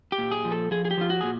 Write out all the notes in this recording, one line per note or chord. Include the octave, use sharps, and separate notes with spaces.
G4
A#2
G#4
F3
A4
F3 G#4
G#4
G4
F3 F4
F#4
A#2 G#4